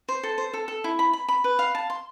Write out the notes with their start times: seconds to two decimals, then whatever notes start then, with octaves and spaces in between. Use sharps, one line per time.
0.09 C5
0.23 A4
0.38 C5
0.53 A4
0.68 A4
0.84 E4
0.99 B5
1.13 B5
1.29 B5
1.44 B4
1.59 F5
1.75 A5
1.90 C6